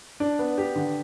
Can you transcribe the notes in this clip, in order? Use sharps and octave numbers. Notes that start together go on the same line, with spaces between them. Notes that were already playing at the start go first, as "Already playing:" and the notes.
D4
B3
G4
D3